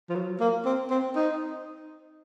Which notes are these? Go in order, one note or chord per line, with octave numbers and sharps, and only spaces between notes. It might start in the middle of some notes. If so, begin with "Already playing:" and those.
F3
F#3
A#3
C4
C4
D#4